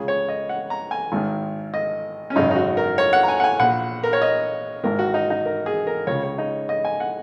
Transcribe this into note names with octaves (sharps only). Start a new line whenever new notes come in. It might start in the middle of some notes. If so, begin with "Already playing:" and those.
Already playing: C#2 C#3 G#4
C#5
D#5
F#5
A#5
G#5
G#1 G#2 D#3
D#5
C#4
G#1 F#2 C#3 D#4
D#4
F#4
A#4
C#5
F#5
A#5
G#5
F#5
G#5
A#1 A#2 F#5
A#4
C#5
D#5
G#1 G#2 D#3 A#4
F#4
D#4
D#4
A#4
G#4
A#4
C#2 C#3 C#5
C#5
D#4
D#5
G#5
F#5